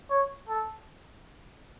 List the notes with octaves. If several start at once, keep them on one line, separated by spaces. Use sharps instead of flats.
C#5
A4